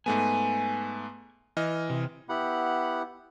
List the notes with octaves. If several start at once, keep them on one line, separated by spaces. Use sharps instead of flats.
G#2 A3 B3 G#5
E3 D#5 F6
C3
B3 E4 G4 F#5 B5